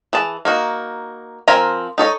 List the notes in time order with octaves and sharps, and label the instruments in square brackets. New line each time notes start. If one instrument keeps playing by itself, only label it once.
[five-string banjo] E3 G#4 A5
A#3 D#4 F#4
F3 C4 A#4 G#5 A#5
D#4 A4 C#5 D#5